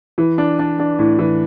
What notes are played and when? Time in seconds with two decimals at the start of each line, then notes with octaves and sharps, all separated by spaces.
0.18 E3
0.38 D4
0.59 D4
0.79 D4
0.99 A2
1.19 E3